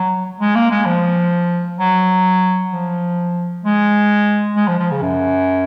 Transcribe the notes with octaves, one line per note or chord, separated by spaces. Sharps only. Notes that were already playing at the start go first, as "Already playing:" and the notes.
Already playing: F#3
G#3
A#3
G#3
F3
F#3
F3
G#3
G#3
F3
F3
C#3
F#2